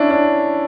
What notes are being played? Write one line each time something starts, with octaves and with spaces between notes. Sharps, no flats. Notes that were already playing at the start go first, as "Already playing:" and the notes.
Already playing: C#4 D4 E4
D4